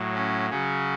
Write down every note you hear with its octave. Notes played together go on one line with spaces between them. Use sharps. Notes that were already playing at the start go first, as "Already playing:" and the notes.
Already playing: A2 F#3
C#4
C#3 F#3 C#4